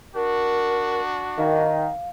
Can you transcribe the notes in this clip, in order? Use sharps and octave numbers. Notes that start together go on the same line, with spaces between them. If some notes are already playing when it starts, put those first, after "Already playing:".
D4 F#4 A#4
D#3 F5